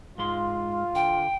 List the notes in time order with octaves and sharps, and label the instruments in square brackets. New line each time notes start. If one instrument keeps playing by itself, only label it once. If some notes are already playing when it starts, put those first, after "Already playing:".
[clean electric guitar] G#2 G#3 C6 [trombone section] F4
[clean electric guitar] D3 [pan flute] G5